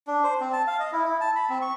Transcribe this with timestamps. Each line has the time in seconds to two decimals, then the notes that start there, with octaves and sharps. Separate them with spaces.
0.07 D4
0.24 C5
0.41 C4
0.53 A5
0.67 F5
0.80 D#5
0.92 E4
1.04 E4
1.21 A5
1.36 B5
1.50 C4
1.62 C#6